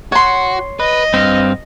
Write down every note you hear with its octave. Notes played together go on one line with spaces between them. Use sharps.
F#4 C#5 C6
B4 D#5
G2 C4 F5